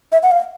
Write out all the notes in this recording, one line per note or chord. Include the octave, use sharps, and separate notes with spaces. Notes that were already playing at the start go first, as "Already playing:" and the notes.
E5
F#5
F5